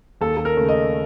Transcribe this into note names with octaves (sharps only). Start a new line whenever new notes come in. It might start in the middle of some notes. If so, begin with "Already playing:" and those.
D#2 A4
A4
A#4
C#3 A3
D#5